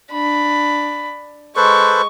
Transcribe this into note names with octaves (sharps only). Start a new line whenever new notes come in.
D4 B5
G#3 A4 B4 C5 C#6